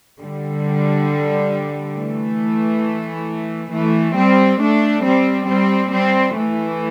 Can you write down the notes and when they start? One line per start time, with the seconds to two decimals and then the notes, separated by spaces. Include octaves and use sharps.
0.21 D3 G3
1.96 E3 A3
3.72 E3 A3
4.16 G3 C4
4.60 A3 D4
5.04 G3 C4
5.48 G3 C4
5.92 G3 C4
6.36 E3 A3